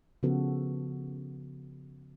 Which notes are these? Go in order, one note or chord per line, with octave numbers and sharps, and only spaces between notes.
C#3 F3 B3 F#4 A4